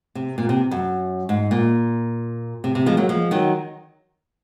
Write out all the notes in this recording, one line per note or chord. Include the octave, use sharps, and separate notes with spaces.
C3
A#2
C3
F#2
G#2
A#2
C3
C3
F3 G#3
F#3 A#3
F3 G#3
D#3 F#3